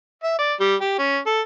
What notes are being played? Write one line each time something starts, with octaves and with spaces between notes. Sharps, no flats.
E5
D5
G3
G4
C#4
A4